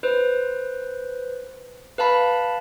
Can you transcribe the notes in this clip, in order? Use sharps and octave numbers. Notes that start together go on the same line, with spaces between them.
B4 C5
B4 F5 A5 B5